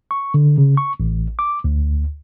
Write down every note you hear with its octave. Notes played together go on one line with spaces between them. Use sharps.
C#6
D3
C#3
C#6
A1
D6
D2